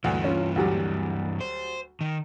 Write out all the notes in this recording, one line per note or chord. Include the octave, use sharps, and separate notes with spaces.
D2 G2 E3
C#4 F4
D2 F#3 G3
C5
D#3